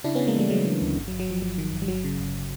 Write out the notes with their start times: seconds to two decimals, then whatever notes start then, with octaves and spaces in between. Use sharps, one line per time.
0.04 C#3 D4 E4
0.15 C#3 B3 C#4
0.27 G#3 A#3
0.35 E3 G3 A3
0.50 C#3 F#3 G#3
0.66 E3
0.81 D2
0.97 G1
1.08 F#3
1.11 G1
1.20 F#3
1.28 G1 F3
1.42 G1 F#3
1.58 D#3
1.73 G1
1.82 G3
1.88 G1 F#3
2.04 C#3
2.19 G1